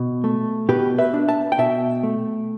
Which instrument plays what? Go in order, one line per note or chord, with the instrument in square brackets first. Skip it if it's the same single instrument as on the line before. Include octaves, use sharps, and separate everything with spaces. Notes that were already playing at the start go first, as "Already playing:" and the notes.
Already playing: [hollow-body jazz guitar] B2
A3
B2 G4 B4
B4 E5
D4
E5 A5
G5
B2 E5 A5
A3